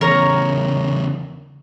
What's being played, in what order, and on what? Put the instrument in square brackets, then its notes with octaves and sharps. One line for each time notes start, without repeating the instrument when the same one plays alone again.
[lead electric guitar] E2 C#3 [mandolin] A#4 C#5